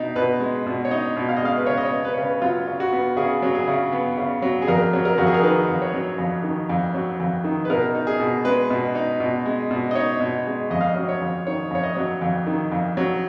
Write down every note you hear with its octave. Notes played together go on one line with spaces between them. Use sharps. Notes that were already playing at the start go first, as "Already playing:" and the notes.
Already playing: B2 D#4
B2 B4
G#3
B2
C#5
D#4 D#5
B2
F5
D#5
G#3 F5
B4
C#3 C#5
D#5
C#5
B3
B4
C#3 C#5
B4
F#3 F4
C#3
F#4
B3
C#3 G#4
F#3
G#4
C#3
B3
C#3
F#3
G#4
F2 A#4
F#3
A#4
F2 F#4
G#4
A#4
D#3 B4
F2
C#5
F#3
F2
D#3
F2
F#3
F2
D#3
B4
B2 A#4
D#4
G#4
B2
G#3 B4
B2
D#4
B2
G#3
B2
D#5
D#4 C#5
B2
G#3
F2 D#5
F5
D#5
F#3
C#5
F2
D#3 C#5
F2 C#5
D#5
F#3
F2
D#3
F2
F#3